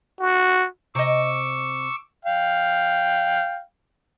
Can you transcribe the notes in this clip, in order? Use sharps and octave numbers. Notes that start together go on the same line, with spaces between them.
F#4
C3 D#5 C#6 D6 E6
F5 G5